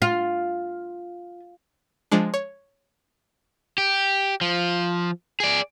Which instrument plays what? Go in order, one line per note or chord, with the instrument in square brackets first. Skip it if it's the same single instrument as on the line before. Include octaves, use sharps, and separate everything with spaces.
[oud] F4
[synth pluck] F3 G#3 D4
C#5
[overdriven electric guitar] G4
F3
G#4 D5